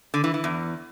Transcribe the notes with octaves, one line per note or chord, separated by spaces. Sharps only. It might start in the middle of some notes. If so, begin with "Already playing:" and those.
D3
E3
E3
E2